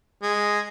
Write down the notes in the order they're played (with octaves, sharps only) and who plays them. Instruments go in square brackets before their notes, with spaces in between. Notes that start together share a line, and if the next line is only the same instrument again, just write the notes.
[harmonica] G#3